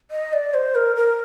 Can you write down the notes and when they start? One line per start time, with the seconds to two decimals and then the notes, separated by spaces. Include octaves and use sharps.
0.11 D#5
0.33 D5
0.54 C5
0.75 A#4
0.96 A#4